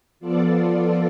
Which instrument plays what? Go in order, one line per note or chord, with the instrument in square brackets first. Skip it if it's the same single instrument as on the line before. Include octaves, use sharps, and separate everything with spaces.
[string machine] F3 B3 F4 A4 D5